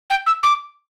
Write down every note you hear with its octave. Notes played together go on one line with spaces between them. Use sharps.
G5
E6
D6